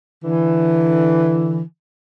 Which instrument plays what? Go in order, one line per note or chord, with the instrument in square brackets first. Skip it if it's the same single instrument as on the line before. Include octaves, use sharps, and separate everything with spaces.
[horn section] D3 E3